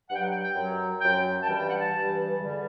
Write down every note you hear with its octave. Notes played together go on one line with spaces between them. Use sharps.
G2 F#3 F#5 G5
F#5
G5
G5
F#2 F#3
F#2 F#3 G5
A5
G2 E3 G3 G5
G5
F#5
A5
G2 E3 G3
E2 D3 G3